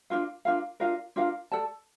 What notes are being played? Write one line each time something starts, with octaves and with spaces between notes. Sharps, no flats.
D4 F4 A#4 F5
D4 F4 A#4 F5
D4 F4 A#4 F5
D4 F4 A#4 F5
A4 D5 A5